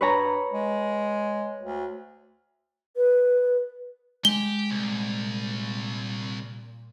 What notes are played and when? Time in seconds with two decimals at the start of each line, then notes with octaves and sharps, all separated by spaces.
0.01 G2 B4 C#5 A#5
0.52 G#3
1.63 D2
2.96 B4
4.25 G#3 G4 G7
4.71 C2 A#2